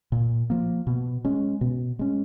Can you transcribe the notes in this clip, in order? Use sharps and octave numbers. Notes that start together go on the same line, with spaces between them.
A#2
F3 A#3
B2
G#3 C#4
B2
G#3 C#4